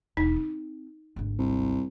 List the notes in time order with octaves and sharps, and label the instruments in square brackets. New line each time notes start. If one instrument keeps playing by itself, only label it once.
[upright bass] E1 [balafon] D#4
[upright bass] C4
G#1 D2
[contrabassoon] C2